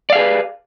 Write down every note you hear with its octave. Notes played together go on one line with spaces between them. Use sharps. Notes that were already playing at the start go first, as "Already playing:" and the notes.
G4 G#4 B4 D5 F5